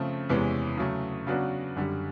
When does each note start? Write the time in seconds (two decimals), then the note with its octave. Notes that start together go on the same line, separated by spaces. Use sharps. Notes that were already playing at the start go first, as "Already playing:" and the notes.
Already playing: C#3 F3 A3 C4
0.29 E2 C3 E3 G#3 C#4
0.77 C#3 F#3 A3
1.27 C#3 F#3 B3 D4 F#4
1.76 F#2 D3 G3